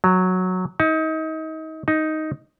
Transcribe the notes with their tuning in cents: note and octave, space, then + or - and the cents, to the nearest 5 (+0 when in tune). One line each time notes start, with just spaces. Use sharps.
F#3 -5
D#4 +30
D#4 +5